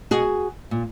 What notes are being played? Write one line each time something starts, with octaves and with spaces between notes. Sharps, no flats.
B2 F#4 G#4
A#2